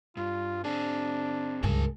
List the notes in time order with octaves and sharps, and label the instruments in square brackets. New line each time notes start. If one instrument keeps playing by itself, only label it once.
[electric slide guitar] G2 [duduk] F4
[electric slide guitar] C4 G#4 [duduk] D4
[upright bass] C#2 G2 [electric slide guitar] A#4 G#5 A5